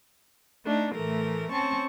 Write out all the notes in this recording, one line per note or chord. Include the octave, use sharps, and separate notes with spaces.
A3 D4 D#4
A2 E3 A3 A#4
C4 C#4 A5 C#6